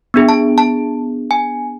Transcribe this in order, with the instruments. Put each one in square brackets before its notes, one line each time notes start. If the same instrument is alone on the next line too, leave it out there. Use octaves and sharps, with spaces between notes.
[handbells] B3 D4 G#4
A5
A5
G#5